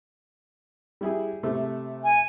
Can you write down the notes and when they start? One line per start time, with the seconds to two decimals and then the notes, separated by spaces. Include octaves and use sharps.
1.01 G3 E4 G#4
1.43 C3 A3
2.04 G#5